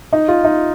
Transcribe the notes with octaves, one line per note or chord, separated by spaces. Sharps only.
D#4
F4
D#4